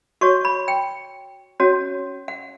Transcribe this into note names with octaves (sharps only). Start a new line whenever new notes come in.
F#4 C#5 C#6
B5
G5
C#4 F#4 C#5
F#5